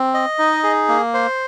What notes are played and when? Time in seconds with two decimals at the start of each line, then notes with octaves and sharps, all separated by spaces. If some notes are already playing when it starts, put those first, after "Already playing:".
Already playing: C4
0.14 D#5
0.39 D#4
0.63 G#4
0.88 A#3
1.14 C5